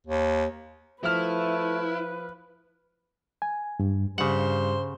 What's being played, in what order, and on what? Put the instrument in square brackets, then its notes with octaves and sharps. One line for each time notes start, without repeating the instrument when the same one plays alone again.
[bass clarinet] D#2
[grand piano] F3 F6 [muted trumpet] A3 [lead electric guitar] E4 [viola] B4
[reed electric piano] G#5
G2
[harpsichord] G2 [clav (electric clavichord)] C#3 F#5 [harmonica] C5